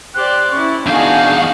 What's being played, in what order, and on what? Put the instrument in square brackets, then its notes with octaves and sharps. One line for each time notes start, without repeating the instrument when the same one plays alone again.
[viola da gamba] G4 C5 D5 [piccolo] F#6
[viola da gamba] C#4 E4 [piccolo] C#6
[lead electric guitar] E2 F5 [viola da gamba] B3 D#4 F#4 [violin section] D4 G#4 [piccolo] G6